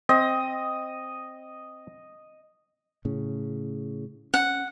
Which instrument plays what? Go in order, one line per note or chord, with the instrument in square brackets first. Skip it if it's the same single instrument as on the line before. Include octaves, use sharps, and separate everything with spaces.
[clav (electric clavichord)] C4 [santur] D#5
[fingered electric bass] A2 C#3
[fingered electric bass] C#4 [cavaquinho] F#5